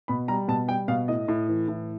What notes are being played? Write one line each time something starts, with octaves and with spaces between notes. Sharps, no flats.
B2 B5
G3 A#5
B2 A5
G3 G5
B2 F5
A2 D#5
A2
E3
A2